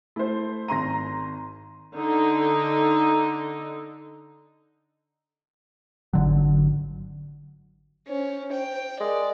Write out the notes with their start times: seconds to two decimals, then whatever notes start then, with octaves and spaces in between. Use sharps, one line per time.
0.16 A3 E4 C5
0.68 G#1 A#5 C6 A#6 D#7
1.98 D3 D#4
6.13 G#1 D3 F#3
8.08 C#4 C5
8.53 G5
9.00 G#3 A#4 D5